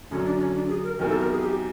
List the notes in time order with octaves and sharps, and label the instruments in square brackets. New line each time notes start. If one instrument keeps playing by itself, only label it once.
[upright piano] F#2 D3 F#3 [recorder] C#4
[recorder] D4
C#4
D4
G#4
A#4
[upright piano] E2 C3 D#3 F#3 [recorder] A#4
[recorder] A4
A#4
G#4
G4